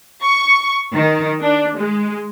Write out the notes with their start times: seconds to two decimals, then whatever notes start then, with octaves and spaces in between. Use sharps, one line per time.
0.23 C#6
0.94 D#3
1.42 D4
1.77 G#3